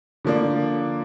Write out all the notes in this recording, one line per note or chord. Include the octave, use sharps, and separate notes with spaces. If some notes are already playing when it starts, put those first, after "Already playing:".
D3 F3 A#3 D4